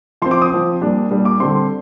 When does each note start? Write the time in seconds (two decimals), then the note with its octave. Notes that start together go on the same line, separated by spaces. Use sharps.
0.22 F3 C4 C6
0.31 D6
0.42 D#6
0.52 F3 C4
0.81 A#2 G3 D4
1.11 A#2 G3 D4
1.25 D6
1.40 D3 G3 C4 C6